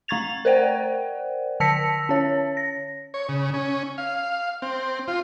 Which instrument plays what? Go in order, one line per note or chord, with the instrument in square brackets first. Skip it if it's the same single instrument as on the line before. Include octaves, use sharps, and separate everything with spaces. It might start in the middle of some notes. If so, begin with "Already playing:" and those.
[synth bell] A3 A#5 C#6 G#6 A6 F7
A#4 C5 D5 F#5 G5
D3 A5 E6 A#6 B6 C#7
C#4 C#5
A#6
[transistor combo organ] C#5
C#3
C#4
F5
C4
F4